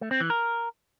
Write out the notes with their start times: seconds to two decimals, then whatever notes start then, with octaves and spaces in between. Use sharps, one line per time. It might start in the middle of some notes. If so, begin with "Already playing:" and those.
0.01 A3
0.11 C4
0.20 E3
0.30 A#4